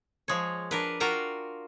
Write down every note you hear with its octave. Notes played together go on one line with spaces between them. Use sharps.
F3 G#3 C#5
D4 A#4 B4
F4 F#4 A#4 F5 G5 A#5